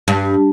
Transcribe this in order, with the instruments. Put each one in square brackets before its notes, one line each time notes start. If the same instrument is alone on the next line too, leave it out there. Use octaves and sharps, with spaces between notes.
[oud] G2